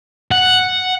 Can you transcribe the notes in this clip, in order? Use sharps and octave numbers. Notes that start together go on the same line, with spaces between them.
F#5